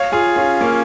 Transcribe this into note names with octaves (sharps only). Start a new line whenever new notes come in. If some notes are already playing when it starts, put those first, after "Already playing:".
Already playing: C#5 F5
F4 G#4
C#4 F4
A#3 C#4